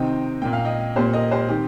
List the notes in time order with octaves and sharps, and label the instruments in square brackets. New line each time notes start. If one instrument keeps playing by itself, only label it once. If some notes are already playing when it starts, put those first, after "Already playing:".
Already playing: [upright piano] C3 D#3 C4 D#5 G5
A#2 A#3 G5
F5
D#5 G5
A#2 A#3 G4 C5
A#4 D#5
G4 C5
D#3 C4 G4